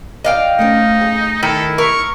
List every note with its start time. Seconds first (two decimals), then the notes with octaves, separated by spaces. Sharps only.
0.25 D5 D#5 F5 G5
0.59 A3 C4 C#4 D#4
1.01 G#4
1.43 D#3 E4 A4
1.78 A#4 C#6